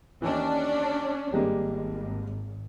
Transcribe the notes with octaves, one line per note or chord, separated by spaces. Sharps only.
D#2 E3 C#4 D4
G#1 G3 G#3 A#3